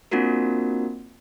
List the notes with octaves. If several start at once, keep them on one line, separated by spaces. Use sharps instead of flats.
A#3 C4 D4 F4 F#4 A#4